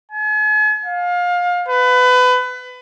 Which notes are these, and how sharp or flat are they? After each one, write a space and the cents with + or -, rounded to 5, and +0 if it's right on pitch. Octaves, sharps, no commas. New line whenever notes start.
G#5 +40
F5 +25
B4 +25